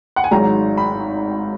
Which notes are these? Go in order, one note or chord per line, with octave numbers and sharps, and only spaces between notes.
F#5
G#5
G#1 G#2 F#3 A#5
B5